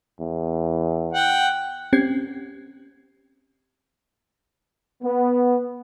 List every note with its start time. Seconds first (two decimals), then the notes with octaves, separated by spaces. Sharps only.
0.20 E2
1.13 F#5 G5
1.93 C4 C#4 G4 G#6 C7
5.03 B3